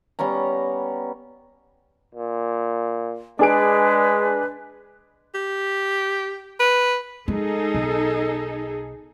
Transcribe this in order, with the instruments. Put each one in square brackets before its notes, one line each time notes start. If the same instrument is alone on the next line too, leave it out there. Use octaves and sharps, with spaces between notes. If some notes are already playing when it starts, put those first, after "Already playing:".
[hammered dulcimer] G3 B3 C#4 A#5
[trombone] A#2
[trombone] G#3 [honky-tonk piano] D4 G#4 D7 [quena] B4
[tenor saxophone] G4
B4
[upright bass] G#3 [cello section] D#4 G#4 A4
[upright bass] B1